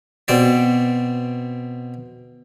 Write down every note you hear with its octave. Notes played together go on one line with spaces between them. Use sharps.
B2 C4 D5